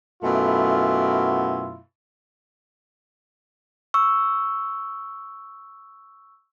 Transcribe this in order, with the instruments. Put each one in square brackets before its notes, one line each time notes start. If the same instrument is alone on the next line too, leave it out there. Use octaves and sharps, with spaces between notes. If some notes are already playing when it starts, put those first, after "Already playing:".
[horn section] F#2 B2 A3 E4 F4
[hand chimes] C#6 E6